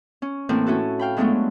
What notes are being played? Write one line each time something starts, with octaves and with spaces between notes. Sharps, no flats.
C#4
A2 E3 A#3 C4 E4
C#4 E4 F#4 A4
F5 G5 B5
F#3 G#3 A3 B3 D4 F4